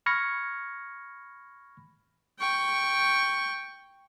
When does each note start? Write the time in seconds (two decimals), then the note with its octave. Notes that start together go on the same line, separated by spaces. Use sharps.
0.06 B5 C#6 F6 G#6 A#6 C#7
2.40 G5 C#6